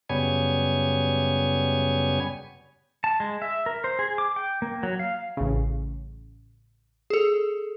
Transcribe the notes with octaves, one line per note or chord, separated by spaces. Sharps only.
F#2 C#3 G3 B3 C#5 G#5
A5
G#3
E5
A#4
C5
G#4
D6
G5
A#3
F#3
F5
A1 C#3
G#4 A4